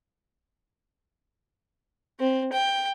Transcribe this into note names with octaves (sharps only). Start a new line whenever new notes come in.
C4
G5